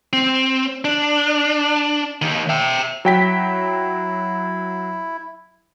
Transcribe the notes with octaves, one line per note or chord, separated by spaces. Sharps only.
C4
D4
D#2 D#3
E5 G5
F#3 E4 G5 B6